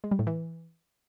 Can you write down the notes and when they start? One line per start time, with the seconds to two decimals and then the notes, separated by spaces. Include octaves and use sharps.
0.04 G#3
0.11 G3
0.19 A2
0.27 E3